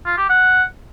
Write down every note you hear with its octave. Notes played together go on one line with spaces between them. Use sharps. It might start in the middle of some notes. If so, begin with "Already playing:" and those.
F4
G4
F#5